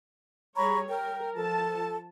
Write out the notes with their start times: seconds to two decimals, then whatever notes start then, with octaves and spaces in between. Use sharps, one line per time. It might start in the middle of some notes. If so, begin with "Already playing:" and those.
0.57 G3 G#4 C#5 A#5 B5 C#6
0.89 A#4 G5
1.35 F3 A4 A5